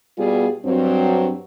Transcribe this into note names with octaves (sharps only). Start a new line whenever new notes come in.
B2 G3 B3 F4 G4 G#4
G2 F#3 C4